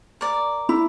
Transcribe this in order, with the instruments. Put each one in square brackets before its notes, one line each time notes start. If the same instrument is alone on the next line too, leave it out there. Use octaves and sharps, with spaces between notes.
[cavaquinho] A#4 D5
[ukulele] E4